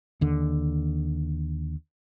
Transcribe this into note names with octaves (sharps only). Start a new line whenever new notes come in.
D#2 D3